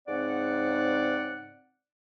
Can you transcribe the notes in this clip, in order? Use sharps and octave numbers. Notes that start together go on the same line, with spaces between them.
G#2 C#3 C4 D5 F#5